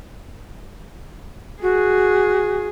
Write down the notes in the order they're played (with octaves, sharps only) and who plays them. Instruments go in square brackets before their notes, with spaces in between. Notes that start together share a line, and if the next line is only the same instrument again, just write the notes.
[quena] F#4 [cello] G#4